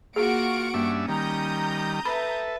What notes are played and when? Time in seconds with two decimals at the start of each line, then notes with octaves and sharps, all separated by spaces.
0.16 A#3 F4 F#4 G#4 F#5 C#6 D7
0.74 G2 A#3 C#4 D4 E5
1.08 D#3 G3 A#5 D#6 G6
2.05 A4 B4 E5 B5